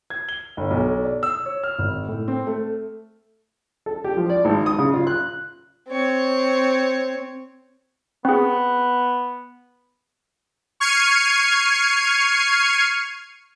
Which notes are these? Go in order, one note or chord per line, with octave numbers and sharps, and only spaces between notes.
G#6
G7
G1
B1
D5
E6
C#5
F6
G#1
A2
C4
A3
A4
G4
F3
D5
G#1
D#6
C#3
F4
F#6
C4 C#5
B3 C4 G#4
C#6 F6 G#6 C7 C#7 D#7